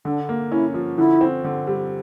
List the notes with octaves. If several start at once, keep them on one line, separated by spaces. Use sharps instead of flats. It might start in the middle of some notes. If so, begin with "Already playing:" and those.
D3 D4
A#3
C#4 E4
F3
D3 E4
C4
D3
G3